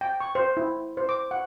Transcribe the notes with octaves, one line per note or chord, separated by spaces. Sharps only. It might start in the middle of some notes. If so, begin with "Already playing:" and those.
G5
C#6
C5
E4
C5
D6
F#5